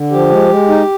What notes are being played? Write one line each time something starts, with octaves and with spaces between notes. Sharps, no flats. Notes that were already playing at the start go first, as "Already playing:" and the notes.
Already playing: D3
F3 G4
G#3
G#3
D#4